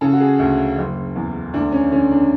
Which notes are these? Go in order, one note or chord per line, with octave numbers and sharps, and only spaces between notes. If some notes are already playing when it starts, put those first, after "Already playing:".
C#3 A4
F#4
G#4
D2 F#4
F#1
E2
D2 D4
C#4
D3 C#4
D4